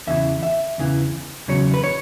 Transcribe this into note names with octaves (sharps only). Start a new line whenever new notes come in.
E2 C#3 E3 E5
E5
E2 C#3 E3
E2 C#3 F#3 C#5
B4
C#5